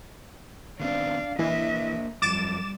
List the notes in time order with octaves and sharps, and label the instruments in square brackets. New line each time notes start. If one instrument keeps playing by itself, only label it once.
[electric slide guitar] D#3 B3 C4 [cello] D4 F5
[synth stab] E3 [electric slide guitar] A#3 D4 [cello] D#5 E5
[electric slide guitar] F#2 F3 [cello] G3 [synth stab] D6 A6 E7